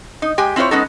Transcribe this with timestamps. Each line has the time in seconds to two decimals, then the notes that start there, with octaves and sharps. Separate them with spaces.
0.22 D#4
0.38 G#3 G4 G5 G#5
0.56 C4 E4 F4 C5 C#5
0.71 G#3 B3 C#4 D#4 A4